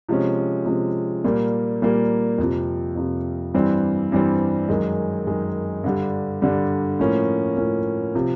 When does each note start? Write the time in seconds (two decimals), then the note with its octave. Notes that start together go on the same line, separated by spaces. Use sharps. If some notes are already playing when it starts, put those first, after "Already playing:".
0.09 C3 F3 G#3 C#4
0.66 C3 F3 G#3 C#4
1.24 A#2 G3 A#3
1.82 A#2 G3 A#3
2.38 F2 C3 F3
2.96 F2 C3 F3
3.54 G2 E3 G3 C4
4.12 G2 E3 G3 C4
4.69 F#2 D#3 G#3
5.26 F#2 D#3 G#3
5.84 G2 D3 G3
6.42 G2 D3 G3
6.99 A2 F3 A#3 C#4
7.57 A2 F3 A#3 C#4
8.15 C3 F3